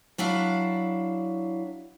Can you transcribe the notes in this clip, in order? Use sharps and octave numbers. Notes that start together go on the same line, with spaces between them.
F#3 D4 E4 F5